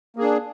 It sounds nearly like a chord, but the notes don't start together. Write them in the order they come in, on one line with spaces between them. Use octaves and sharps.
A#3 G#4 D4